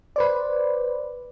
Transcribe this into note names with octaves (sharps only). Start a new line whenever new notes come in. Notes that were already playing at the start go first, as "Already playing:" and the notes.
B4 C5 D5